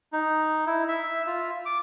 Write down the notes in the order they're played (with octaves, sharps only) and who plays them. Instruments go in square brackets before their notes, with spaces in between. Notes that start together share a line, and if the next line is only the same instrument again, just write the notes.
[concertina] D#4
E4
E5
F4
D6